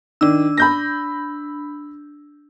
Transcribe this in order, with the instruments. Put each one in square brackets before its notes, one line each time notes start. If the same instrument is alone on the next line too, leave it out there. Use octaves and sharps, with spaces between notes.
[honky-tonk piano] D#3 [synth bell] D4 E6
[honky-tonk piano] B5 G6 A#6